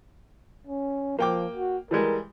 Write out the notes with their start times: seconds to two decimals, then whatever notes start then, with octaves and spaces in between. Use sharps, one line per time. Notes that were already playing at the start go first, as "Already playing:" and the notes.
0.67 C#4
1.19 F3 A#3 G5 D6
1.55 F#4
1.91 E3 G3 G#3 A#4